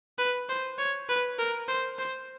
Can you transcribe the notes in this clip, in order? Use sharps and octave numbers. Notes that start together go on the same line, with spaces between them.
B4
C5
C#5
B4
A#4
C5
C5